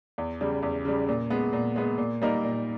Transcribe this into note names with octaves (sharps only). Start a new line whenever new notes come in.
E2
C#3 G3
E2
C#3 G3
A#2
G#3 B3
A#2
G#3 B3
A#2
G3 A#3 D#4 A#4
A#2